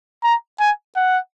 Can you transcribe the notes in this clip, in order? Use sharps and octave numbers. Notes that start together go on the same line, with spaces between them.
A#5
G#5
F#5